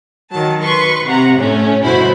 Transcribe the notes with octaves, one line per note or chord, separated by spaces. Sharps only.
D#3 F#3 A5
B4 C6 C#6
C3 F#5 A#5
A2 A3 C#4
G1 B2 E4 F#4 C5 B5